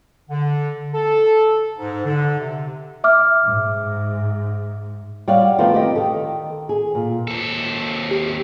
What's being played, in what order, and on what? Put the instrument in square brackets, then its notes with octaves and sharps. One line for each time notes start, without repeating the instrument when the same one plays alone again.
[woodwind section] D3
A4
G#2
D3
C3
[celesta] E5 D6 F6
[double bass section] G#2
[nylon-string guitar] G3 C#5 D5 F5 F#5
D#3 F3 A3 B3 C4 F4
G4 D#5
D#3 A4
G#4
A#2
[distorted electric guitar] D#2 A4
[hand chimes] G4